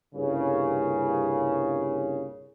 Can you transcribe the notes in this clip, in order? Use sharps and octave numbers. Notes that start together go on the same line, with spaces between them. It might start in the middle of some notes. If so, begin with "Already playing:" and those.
C2 G2 A#2 C#3